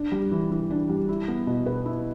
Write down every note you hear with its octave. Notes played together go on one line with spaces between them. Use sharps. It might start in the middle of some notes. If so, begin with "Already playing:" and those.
Already playing: D4
G3
E3
E3
D4
G3
E4
B3
B2
B4
E4